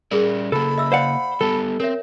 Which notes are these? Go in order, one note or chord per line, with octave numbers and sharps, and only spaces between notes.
G3 C#4 G#4 A#4 D5
C#3 A#3 A4 B5
D#5 E5 E6
C5 D5 D#5 F5 F#5
G3 B3 G4 A4
C4 A#4 C#5 E5